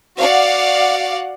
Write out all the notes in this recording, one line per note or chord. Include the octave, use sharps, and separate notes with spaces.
F#4 D5 F5 F#5